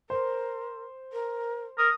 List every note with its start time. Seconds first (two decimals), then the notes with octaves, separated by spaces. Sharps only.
0.10 A#4 C5
1.13 A#4
1.78 A#4 D#6